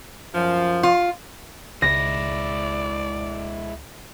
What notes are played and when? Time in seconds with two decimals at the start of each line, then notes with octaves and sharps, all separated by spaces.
0.33 F#2 F3
0.83 F4
1.82 C#2 G#3 E4 D5 A#6